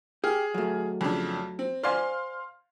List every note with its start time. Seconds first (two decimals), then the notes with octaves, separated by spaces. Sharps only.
0.24 G4 G#4 F6
0.54 F#3 A3
1.01 F2 C#3 D4
1.59 C4
1.83 C5 D5 F5 G#5 C6 F6